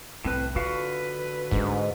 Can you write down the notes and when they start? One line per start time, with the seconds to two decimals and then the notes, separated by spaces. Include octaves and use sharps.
0.24 C2 A2 C4 B4
0.55 D3 F4 F#4 B4 F5
1.51 G#2 G#3 D4